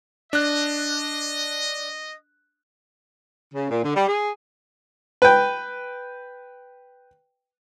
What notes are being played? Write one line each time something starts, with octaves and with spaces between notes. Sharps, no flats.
D4 D#5 F#6
C#3
A#2
D3
G3
G#4
B4 G5